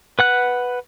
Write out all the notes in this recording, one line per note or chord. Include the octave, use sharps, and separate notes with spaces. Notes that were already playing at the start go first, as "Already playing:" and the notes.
B4 F#5 F#6